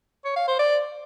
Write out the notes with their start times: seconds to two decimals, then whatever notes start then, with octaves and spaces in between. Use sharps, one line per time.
0.25 C#5
0.36 F5
0.48 C5
0.60 D5